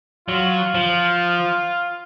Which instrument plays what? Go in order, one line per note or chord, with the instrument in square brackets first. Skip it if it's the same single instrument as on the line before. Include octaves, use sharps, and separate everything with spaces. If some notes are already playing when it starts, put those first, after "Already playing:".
[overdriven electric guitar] F#3 [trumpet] F4
[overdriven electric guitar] F3